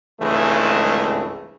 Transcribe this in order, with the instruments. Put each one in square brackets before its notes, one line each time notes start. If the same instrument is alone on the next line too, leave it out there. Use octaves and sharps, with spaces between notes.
[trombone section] G#1 C#2 G2 E3 G#3 A3